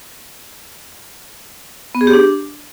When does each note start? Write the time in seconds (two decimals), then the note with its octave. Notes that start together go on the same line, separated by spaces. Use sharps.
1.95 B3
2.01 G#4
2.07 G4
2.13 D4